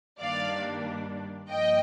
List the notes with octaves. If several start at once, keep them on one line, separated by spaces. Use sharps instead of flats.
G2 D#3 G3 A#3 D4 D5 F5
G2 F3 A#3 D#5 G5